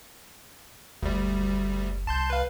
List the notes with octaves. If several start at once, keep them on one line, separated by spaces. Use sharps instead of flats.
F#1 D2 G3
C2 A5 C6 G6
B4 F5